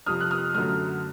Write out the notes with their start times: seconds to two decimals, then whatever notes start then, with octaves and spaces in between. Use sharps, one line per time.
0.06 F2 C3 F3 D#6 F6
0.21 F#6
0.31 D#6 F6
0.54 F#2 D3 F#3 A3 D#6 F6